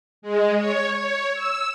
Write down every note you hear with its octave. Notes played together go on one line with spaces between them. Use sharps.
G#3
C#5
C#5
E6